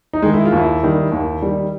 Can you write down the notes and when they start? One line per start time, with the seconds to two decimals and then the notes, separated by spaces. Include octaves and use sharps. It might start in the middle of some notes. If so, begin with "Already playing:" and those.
0.13 D#4
0.22 D#3 G#3
0.33 E4
0.45 F4
0.52 D#2 E4
0.83 D#3 G3
1.12 D#2
1.42 D#3 G3